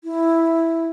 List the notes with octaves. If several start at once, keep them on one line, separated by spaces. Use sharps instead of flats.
E4